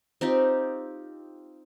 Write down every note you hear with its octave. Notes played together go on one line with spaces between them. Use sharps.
C4 D#4 F4 G4